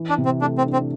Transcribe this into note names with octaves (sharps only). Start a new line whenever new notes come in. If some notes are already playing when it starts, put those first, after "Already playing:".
Already playing: E3
D4
C3
C4
A3 D4
C4
D4
C4